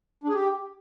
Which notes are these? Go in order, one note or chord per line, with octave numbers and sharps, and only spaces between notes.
D4
G#4
G4